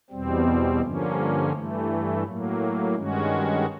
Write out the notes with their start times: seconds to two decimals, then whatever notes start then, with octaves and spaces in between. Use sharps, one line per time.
0.10 E2 B2 G3 C4
0.81 G2 D3 F3 A#3 C#4
1.52 G2 E3 A3
2.24 A2 F#3 A#3
2.95 G2 D#3 G#3 C#4 F#4